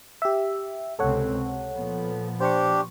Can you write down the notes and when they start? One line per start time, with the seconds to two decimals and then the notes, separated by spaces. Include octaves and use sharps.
0.22 G4 E5
0.99 C#2 C3 C4 A4 C#5 F#5
1.30 C3
1.73 A#2 F3 B3
2.41 D4 G4 C5 C#6